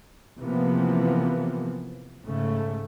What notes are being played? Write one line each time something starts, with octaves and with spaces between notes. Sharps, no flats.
C3 E3 F3 A#3 B3
G#2 C#3 A3